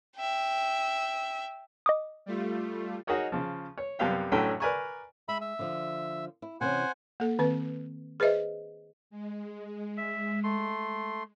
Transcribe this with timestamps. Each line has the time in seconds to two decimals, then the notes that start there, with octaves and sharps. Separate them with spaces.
0.16 E5 G5
1.86 D#5 D6 D#6
2.26 G3 A3 F4
3.07 D#4 F#4 G#4 A#4 C#5 D#5
3.32 C#3 F3
3.78 C#5
3.99 F#2 C3 G3 B3 F5 G5
4.32 A1 A2 D3 F#3 C#4 G5
4.60 A#4 B4 D5 G#5 A#5 C#6
5.28 G#3 E5 B5
5.41 E5
5.59 D3 F3
6.42 E4
6.61 C3 E3 C#4 C5 F#5 G#5
7.20 A#3 A4
7.39 D#3 C4 B4
8.20 G#4 B4 C5 D#5 E5
9.10 G#3
9.97 E5
10.44 A3 C6